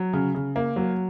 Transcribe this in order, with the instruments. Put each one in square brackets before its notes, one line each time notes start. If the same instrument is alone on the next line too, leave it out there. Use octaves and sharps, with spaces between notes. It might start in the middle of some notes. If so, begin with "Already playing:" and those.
Already playing: [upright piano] F#3
C#3
C#3
A#3
F#3